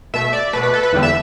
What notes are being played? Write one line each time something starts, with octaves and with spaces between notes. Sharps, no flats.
B2 A3 E5
D5
B2 A3 B4
B4
A4
B4
E2 D3 G3
E5